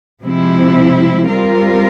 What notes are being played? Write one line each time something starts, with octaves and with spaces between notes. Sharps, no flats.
C3 F3 G#3 C4 E4
G3 C4 F4 A#4